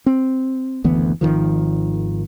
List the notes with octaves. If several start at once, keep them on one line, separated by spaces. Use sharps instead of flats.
C4
F#1 D2 E3 B3
G#1 E2 D#3 F3